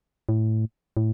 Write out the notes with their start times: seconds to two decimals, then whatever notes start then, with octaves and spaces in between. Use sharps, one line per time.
0.29 A2
0.97 A2